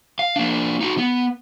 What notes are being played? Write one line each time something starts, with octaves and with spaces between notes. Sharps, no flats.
F5
A#3 D4
D#4 F#4
B3